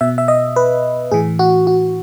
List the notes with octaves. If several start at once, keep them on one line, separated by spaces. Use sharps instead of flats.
B2 E5
E5
D#5
B4
A2 E3 G#4
F#4
F#4